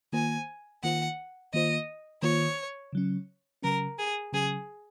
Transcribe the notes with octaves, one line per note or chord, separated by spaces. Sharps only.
D#3 A#3 F4 C5 G#5
D#3 A#3 F4 C5 F#5
D#3 A#3 F4 C5 D#5
D#3 A#3 F4 C5 C#5
C#3 F#3 C#4
C#3 F#3 C#4 A#4
G#4
C#3 F#3 C#4 G#4